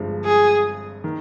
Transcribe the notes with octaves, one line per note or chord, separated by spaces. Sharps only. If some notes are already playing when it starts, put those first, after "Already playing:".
Already playing: G1 G2 F3 G#3 C4
G#4
D#3